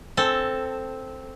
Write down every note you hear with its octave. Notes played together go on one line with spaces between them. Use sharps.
C4 A4